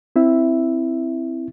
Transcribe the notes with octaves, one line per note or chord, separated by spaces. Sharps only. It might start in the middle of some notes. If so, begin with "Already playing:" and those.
C4 E4 E5